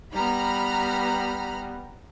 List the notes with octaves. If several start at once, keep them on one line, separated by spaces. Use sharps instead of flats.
G3 B3 A#5 B5 F6